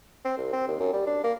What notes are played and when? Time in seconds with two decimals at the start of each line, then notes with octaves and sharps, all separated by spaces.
0.25 C4
0.37 C2
0.52 C4
0.68 D#2
0.80 F#2
0.93 G3
1.06 D4
1.24 A#3